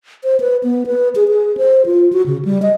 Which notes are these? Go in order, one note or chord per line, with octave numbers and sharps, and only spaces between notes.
C5
B4
B3
B4
G#4
G#4
C5
F4
F#4
C#3
G3
D#5